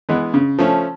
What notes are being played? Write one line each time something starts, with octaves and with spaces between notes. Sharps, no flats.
E3 G#3 B3
C#3
F3 A3 C#4